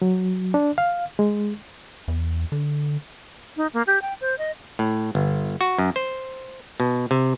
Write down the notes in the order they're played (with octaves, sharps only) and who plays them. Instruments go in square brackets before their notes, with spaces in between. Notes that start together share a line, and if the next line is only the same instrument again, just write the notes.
[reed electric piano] F#3
D4
F5
G#3
[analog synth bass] E2
D3
[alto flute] D#4
A#3
G4
G5
C5
D#5
[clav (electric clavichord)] A2
G1
F#4
F#2
C5
B2
C3